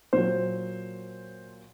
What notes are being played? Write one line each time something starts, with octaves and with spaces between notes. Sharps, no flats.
A#2 F#3 C5